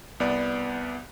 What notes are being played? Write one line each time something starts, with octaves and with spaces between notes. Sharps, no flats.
C2 B3 D5